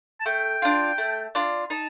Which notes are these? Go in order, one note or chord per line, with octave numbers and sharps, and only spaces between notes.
A5
A3 G5
D4 F4
A3
D4 F4
D#4 A5